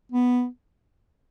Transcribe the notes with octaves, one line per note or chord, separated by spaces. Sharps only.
B3